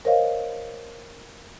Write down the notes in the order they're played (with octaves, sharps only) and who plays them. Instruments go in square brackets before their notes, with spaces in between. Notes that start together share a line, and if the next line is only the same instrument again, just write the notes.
[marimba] A#4 C5 C#5 D#5 F5